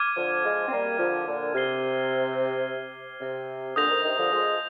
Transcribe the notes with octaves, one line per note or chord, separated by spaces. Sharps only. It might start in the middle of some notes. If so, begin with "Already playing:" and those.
Already playing: D6 F6 G#6 D#7
D3 F3
F3 G#3
C4
G3 A#3
D3 F3
A#2 D3
C3 F6 G#6 C7 G7
C3
A#2 D3 D#6 G6 A#6 F7
C3 D#3
C3 D#3
D3 F3
F3 G#3